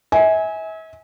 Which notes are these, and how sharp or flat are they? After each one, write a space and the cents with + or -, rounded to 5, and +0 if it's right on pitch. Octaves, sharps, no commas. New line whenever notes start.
E5 -40 G#5 +0